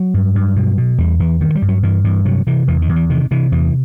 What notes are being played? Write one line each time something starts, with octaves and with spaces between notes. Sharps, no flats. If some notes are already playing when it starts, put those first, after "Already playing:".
Already playing: F#3
G2
G2
B2
B2
E2 G3
E2 E3
G2 D#3
G3
G2
F#3
G2 E3
G2 E3
C3 F#3
C3 E3
E2 E3
D#3
E2
E3
C3 D#3
C3 E3
E2 E3